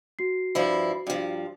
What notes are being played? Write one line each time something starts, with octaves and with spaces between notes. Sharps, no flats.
F#4 C7
G2 F3 E4
G2 F3